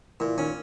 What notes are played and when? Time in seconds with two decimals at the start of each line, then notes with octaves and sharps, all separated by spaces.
0.20 A#2 E3
0.37 D#3 C#4